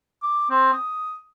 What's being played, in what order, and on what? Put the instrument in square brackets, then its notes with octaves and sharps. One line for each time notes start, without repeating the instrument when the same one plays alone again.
[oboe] D6
C4
D#6